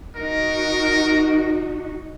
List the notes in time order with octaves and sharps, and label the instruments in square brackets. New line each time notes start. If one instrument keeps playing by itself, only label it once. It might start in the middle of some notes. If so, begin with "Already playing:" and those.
[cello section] D#4 F#4 [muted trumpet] A#4